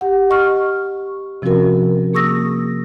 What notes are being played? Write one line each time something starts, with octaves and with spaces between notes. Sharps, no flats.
G4 F#5
D#5 C#6 F6
C3 F3 C4 C#4 F#4 A#4
A#3 G#4 C#6 D#6 E6 A#6